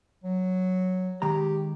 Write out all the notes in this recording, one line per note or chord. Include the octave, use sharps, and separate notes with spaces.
F#3
D#3 G#3 G4 A#5